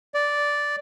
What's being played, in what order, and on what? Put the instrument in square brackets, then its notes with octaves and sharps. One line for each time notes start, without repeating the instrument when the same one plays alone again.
[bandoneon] D5